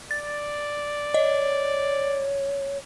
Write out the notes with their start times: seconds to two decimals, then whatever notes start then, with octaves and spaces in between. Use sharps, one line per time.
0.11 D5 A6
1.14 C#5 D#5